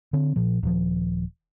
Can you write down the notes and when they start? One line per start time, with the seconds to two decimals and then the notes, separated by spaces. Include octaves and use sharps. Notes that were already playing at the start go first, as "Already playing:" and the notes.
0.13 D3 C4
0.36 A#2 F3
0.63 D#1 F3